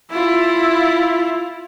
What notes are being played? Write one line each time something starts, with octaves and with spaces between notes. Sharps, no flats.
E4 F4